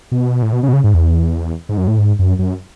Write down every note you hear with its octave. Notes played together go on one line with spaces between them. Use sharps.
B2
A2
B2
C#3
B2
C#3
G#2
E2
G#2
F#2
A2
G#2
F#2
F#2